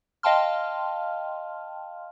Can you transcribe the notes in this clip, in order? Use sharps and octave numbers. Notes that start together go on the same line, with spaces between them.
D#5 F5 G5 A5 C6 F6